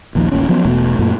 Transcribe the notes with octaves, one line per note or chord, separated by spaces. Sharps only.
A#1 D#2 F3
D#1 A1 A#2 C#4
F3 F#3 B3 C#4
E1 B2 A3 B3
F#2 A#2 A3